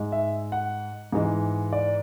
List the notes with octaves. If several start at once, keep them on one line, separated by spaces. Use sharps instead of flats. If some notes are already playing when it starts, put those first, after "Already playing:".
Already playing: G#2 G#3
E5
F#5
G#2 E3 G#3
D5